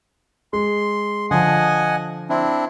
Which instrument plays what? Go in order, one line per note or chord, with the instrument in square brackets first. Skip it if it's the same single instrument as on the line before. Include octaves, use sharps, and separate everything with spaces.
[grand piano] G#3 [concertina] C6
[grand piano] D3 F3 [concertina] D#5 F#5 G#5
[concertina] C4 D4 E4